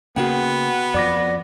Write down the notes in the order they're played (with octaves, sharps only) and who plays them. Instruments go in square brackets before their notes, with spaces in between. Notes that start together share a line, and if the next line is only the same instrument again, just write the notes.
[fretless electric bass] C#3 A#3 [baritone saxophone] B3 [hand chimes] F#4 F#5 G5
[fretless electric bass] F2 F3 [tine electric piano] D5 D6 A#6